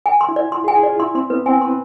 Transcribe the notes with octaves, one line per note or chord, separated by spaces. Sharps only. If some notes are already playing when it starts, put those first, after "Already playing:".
G#5
C6
E4
D5
F4 C6
G#4
G#5
G#4
F4 D5
E4 C6
C4 C6
B3 B4
C4 G#5
B4 C6